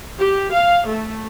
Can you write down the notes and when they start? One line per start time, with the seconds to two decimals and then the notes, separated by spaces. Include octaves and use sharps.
0.17 G4
0.54 F5
0.88 A3